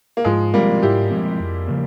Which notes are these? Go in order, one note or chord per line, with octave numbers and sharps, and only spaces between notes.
A#3
G#2 F3 G#3
F3 G3 G#3 A#3 C4
G#2 E4 G4
F3 G#3 C4
F2
C#3 F3 A#3